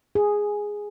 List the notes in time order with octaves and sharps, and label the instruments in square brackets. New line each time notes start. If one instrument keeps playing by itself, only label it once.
[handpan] G#4